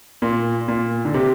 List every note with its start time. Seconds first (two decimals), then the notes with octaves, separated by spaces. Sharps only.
0.22 A#2
0.68 A#2
1.05 D3
1.14 C3